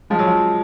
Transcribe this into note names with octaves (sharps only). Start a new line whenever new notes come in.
F3 G#3
F#3
F3